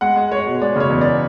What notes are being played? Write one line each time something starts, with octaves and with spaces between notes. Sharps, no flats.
G#3 F#5
G#3
G#3 C#5
B2
G#3 D5
C#3 C#5
E2
D5